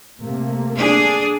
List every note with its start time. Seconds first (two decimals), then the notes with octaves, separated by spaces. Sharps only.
0.19 C3 A3 A#3
0.77 D4 G#4